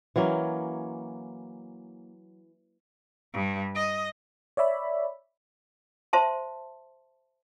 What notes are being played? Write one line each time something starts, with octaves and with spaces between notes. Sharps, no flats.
E3 F#3 A#3 C#4
G2
D#5
C#5 D5 E5 B5
C5 E5 A5 C6